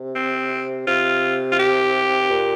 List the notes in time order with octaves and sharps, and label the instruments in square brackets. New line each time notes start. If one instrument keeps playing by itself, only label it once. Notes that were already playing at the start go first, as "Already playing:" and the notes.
Already playing: [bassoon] C3
[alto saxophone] C4
[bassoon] C3 [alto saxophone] F4
[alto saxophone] F4
G4
[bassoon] A#2